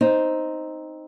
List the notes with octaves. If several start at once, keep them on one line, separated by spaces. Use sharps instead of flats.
C4 D#4